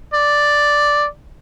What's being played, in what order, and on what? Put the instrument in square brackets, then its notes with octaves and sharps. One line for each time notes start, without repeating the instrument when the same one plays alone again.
[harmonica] D5